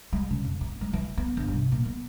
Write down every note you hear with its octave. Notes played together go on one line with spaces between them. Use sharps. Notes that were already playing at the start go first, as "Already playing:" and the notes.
G#3
C#3
F2
C4
G#3
E3
B3
G1
C3
A#2
B3